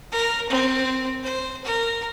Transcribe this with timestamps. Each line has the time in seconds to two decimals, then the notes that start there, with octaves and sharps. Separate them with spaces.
0.12 A#4
0.50 C4
1.23 C5
1.64 A#4